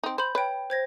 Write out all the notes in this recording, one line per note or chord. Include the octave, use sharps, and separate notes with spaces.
C4 D#4
C5 B5 G6
B4 C#5 G5
C5 G#6 A#6